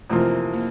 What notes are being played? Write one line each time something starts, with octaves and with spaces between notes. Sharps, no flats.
F2 C3 E3 A3 A#3 F4
A#3